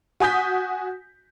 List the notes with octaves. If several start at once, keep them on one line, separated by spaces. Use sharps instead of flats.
F#4 G#5 D#6 G6 B6